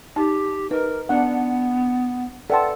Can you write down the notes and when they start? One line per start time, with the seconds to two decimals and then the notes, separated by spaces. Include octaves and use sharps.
0.16 D#4 G4 A5
0.71 D#4 A#4 B4
1.09 B3 D4 F#5
2.50 A4 B4 D5 F#5 G5 A5 C6